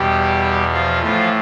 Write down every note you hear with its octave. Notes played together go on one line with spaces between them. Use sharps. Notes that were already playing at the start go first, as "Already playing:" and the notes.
Already playing: E2 B2 G3 G4
F3 F4
A2 E3 F3 F4